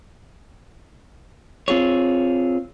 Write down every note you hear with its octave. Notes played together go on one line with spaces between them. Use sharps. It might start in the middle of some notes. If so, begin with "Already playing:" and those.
C4 F4 G#4 C#5